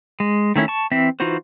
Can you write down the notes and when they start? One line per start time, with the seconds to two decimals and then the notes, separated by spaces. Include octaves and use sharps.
0.20 G#3
0.56 D#3 A3 C#4 E4
0.68 A5 C#6
0.91 E3 C4 E5
1.20 E3 D#4 F4 F#4 C5